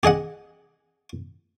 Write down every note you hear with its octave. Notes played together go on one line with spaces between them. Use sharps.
G4 G#4 D#5 F#5